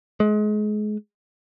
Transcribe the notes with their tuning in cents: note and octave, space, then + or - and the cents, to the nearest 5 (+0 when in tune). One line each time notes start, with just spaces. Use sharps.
G#3 +30